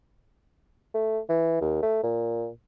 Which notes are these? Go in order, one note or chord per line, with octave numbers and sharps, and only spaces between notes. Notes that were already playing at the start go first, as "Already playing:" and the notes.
A3
E3
D#2
A3
A#2